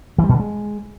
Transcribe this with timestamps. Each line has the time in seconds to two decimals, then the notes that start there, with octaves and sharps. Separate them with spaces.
0.18 E3
0.24 G3
0.29 B2
0.34 D3
0.40 G#3